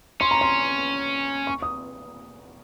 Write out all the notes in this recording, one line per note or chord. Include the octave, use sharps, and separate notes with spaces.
C#4 C6
A#5
C6
C#6
D#6